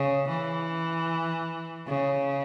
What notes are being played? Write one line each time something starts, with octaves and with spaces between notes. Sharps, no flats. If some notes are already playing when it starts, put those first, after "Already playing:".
Already playing: C#3
E3
C#3